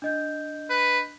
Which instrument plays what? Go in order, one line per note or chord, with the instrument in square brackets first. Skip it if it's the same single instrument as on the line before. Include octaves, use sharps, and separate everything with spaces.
[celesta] D4 D#5 G6
[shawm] B4